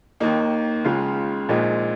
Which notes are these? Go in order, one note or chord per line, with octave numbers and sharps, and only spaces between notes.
D#2 D#3 A#3 D#4
C#2 C#3 G#3 F4
A#1 A#2 G#3 D#4